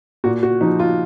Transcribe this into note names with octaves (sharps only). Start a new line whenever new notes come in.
A#2 F#4
F#4
F3 D#4
F4